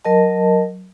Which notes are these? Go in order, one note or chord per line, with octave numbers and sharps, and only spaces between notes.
F#3 A#4 D#5 A5